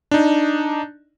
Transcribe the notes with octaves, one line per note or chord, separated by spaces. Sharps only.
D4 D#4